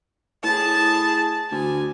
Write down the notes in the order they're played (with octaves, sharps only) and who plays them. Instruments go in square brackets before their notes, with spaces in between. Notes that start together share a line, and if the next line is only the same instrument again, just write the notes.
[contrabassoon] A2 [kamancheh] G#4 A5
[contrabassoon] D2 [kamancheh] G#5